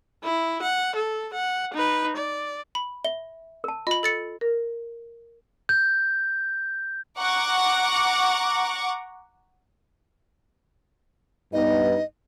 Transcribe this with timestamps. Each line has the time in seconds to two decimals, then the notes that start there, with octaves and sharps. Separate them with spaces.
0.23 E4
0.62 F#5
0.96 A4
1.34 F#5
1.74 D#4 B4
2.17 D5
2.75 B5
3.05 E5 G7
3.64 A#4 A5
3.87 F4 D#5 B5
4.03 A4 A6 C#7
4.41 A#4
5.69 G6
7.20 F#5 A#5 C#6 D6
11.53 G2 B3 D#4 D#5